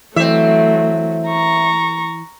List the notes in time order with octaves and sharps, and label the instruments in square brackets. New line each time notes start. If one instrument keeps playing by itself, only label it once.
[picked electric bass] E3 [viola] F#3 A3 [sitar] C4 E5
[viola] A#5 C#6